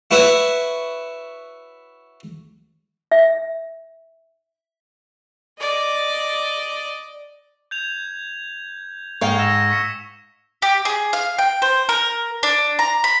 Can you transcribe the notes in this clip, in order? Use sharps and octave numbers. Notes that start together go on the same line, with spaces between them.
E4 F#4 B4 C#5 E5 F#5
E5
D5 D#5
G6 G#6 F7
G#2 F5 G5 C#6 G#6 G7
E6 A#6 E7
C#6 B6 C#7
G4
G#4
F5
G5
C5
A#4
D4
A#5
B5